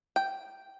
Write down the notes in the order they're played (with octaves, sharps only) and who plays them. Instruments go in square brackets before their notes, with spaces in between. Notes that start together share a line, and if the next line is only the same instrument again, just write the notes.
[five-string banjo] G5